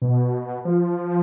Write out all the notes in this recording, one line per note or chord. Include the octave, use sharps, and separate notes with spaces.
B2
F3